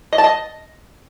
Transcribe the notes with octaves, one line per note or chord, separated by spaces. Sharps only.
D#5
A5
D#5